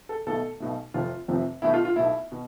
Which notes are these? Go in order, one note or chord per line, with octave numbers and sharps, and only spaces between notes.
A4
B1 B2 A3 A4
B1 B2 A3
F1 F2 C3 F3 A3 F4
F1 F2 C3 F3 A3
B1 B2 A3 E4
F4
F4
B1 B2 A3 E4
B2